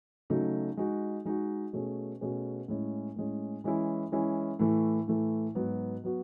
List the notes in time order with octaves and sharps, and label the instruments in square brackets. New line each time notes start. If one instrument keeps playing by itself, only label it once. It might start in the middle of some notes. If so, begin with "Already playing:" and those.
[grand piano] C#3 F#3 A3 D#4
G#3 D#4 F#4
G#3 D#4 F#4
B2 A3 C#4 G#4
B2 A3 C#4 G#4
A2 G#3 C#4
A2 G#3 C#4
E3 G#3 C#4 E4
E3 G#3 C#4 E4
A2 E3 A3
A2 E3 A3
G#2 F#3 B3 F#4
F#3 B3 F#4